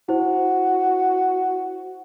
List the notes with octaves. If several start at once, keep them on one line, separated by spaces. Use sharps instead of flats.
E4 F#4 C5